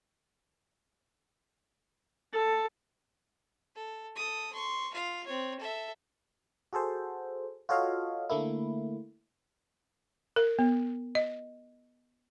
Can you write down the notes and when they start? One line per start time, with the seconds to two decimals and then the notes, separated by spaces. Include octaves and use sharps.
2.33 A4
3.75 A4
4.16 A4 D#6
4.53 C6 C#6
4.94 F4 F5
5.27 C4 C#5
5.60 A4 E5
6.73 F#4 G#4 A4 C5
7.69 F4 F#4 A4 C#5 D#5 F5
8.30 D3 A3 A#3 E4
10.36 A#4
10.59 B3
11.15 D#5